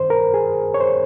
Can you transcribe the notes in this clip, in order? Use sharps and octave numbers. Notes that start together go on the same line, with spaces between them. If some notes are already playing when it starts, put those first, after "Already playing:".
Already playing: G2 D#3 C5
A#4
G#4
C#5
C5